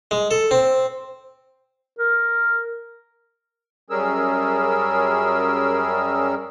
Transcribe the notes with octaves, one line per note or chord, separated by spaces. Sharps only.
G#3
A4
C4
A#4
F#2 G3 C#4 G#4 A#4 E6